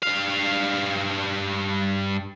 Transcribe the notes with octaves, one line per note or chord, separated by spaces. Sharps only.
G2 F5